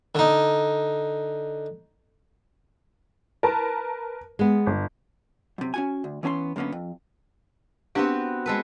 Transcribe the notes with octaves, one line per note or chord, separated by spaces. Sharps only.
D3 D#4
A#4 B4 A5
G#3 B3
G1
F#2 C3
C#4 F#4 G#5
D2
E3 B3 C#4 G#5 C6
F#2 D3 A#3 B3 C#4
F2
B3 C4 D4 F#4 G4
G#3 A4 B4